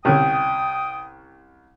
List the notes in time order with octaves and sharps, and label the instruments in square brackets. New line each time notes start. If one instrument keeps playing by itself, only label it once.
[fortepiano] C2 C#4 G4 [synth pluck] B2 D3 [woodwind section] G5 D#6